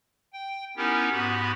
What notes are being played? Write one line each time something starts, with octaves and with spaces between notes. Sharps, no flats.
G5
B3 C#4 D#4 E4 G4 A#4
G#2 B3 F#4 G4 B5